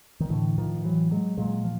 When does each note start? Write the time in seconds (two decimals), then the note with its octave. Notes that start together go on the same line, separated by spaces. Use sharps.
0.20 D#3
0.30 A2 D3 E3
0.58 D#3 F3
0.84 E3 F#3
1.11 F#3 G#3
1.38 A#2 F#3 G#3
1.64 F3